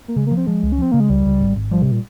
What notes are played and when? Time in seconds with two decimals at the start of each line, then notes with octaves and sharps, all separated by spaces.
0.08 A#3
0.16 C#3 G#3
0.27 A#3
0.31 F3
0.37 C4
0.47 F3 G#3
0.63 C#2
0.72 C#4
0.78 F3 C4
0.92 C#3 A#3
1.00 G#3
1.10 C#2 G3
1.25 C#2
1.40 G#1
1.56 G#1
1.71 F3 G3
1.82 C3
1.92 A#2